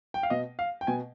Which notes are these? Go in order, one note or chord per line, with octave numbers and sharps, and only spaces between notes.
G5
F5
B2 D#5
F5
G5
B2 G#5